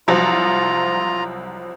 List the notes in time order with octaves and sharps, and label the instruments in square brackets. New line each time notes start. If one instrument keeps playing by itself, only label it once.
[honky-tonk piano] C2 F3 F#3 [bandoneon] F4 A#5